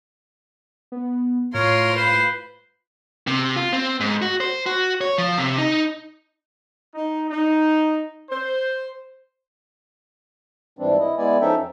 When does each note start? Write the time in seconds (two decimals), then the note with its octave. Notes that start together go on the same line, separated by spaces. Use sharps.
0.92 B3
1.54 A2 F4 A#4 C#5 C6
1.96 B4 C5
3.27 C3
3.56 F4
3.73 C4
4.00 G#2
4.22 F#4
4.40 C5
4.66 F#4
5.01 C#5
5.18 F3
5.38 C3
5.58 D#4
6.95 D#4
7.30 D#4
8.30 C5
10.79 G#2 E3 G3 C4 D4
10.99 E4 D#5
11.18 G#3 B3 E4 D5 G#5
11.41 F3 C#4 D#4 A4 E5 G5
11.58 F2